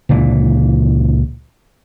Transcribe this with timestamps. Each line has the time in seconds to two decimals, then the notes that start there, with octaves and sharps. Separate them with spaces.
0.09 C#2 A#2 D3 E3